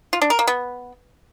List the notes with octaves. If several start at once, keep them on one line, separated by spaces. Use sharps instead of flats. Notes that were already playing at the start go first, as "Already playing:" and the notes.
F4
D4
A#4
A#3
B3